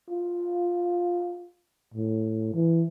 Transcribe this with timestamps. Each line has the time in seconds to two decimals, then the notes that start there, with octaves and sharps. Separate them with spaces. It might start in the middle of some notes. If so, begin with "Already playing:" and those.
0.10 F4
1.94 A2
2.54 E3